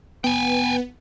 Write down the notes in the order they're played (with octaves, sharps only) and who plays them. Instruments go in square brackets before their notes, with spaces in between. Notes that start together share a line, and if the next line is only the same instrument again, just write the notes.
[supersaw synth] B3 [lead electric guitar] G5 G#5